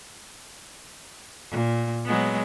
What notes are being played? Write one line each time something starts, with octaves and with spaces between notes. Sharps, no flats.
A#2
F#3 G#3 B3